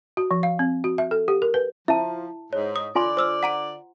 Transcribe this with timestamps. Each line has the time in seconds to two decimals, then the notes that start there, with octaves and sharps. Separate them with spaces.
0.17 F#4
0.31 F3
0.43 F5
0.59 C4
0.84 F#4
0.98 E5
1.11 A4
1.28 G4
1.42 A#4
1.54 B4
1.88 F3 E4 E5 A5
2.53 G#2 C#5
2.76 D#6
2.95 D3 F4 D5 G#5 C6
3.17 C5 E6 F6
3.43 F#5 A#5 D7